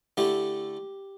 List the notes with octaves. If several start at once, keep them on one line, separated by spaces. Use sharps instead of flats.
D3 A3 E4 G4